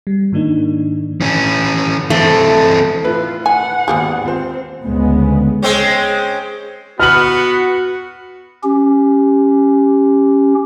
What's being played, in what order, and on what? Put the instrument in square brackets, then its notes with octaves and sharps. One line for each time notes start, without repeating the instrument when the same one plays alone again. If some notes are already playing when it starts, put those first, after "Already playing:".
[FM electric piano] G3
G#2 D#3 A#3 D4 D#4
[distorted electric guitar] E3 C#4
[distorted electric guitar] E3 C4 [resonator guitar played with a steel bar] A3
[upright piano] A2 E4 [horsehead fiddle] F4 [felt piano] B4
[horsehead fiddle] F#5 [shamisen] G#5
[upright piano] G#1 D#2 F5 [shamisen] B3 G4 G#4
[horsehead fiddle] C4 [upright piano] F4 C5
[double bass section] D2 C#3 G#3 B3
[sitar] G#3 C4 C#4
[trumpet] B3 [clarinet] F#4 [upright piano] F6 F#7
[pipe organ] C#4 G4